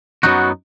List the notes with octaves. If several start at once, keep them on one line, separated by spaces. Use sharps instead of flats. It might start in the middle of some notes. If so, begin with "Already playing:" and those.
F#2 C#3 F#3 B3 D#4 F#4